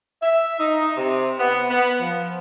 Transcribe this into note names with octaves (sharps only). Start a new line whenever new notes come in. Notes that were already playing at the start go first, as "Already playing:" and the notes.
E5
D#4
C3
B3
B3
F3